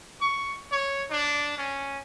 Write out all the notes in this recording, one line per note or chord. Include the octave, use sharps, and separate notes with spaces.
C#6
C#5
D4
C#4